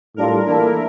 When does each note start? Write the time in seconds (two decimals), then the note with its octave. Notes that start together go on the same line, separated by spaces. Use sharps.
0.16 A2 G3 D4 F4 A4 A#4
0.46 E3 A#3 D4 E4 A4